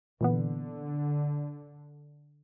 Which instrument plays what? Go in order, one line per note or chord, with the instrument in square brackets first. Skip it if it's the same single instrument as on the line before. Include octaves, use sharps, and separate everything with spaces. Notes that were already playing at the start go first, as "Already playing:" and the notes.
[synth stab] A#2 E3 B3 [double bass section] D3